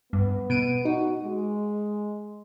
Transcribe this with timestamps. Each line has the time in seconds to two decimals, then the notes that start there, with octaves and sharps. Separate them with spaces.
0.13 G2 B3
0.50 B2 D7 D#7
0.85 D#4 F#4
1.23 G#3